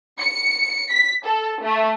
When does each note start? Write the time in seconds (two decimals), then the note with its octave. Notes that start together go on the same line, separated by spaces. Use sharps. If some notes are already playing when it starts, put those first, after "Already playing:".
0.20 C#7
0.92 B6
1.26 A4
1.63 A3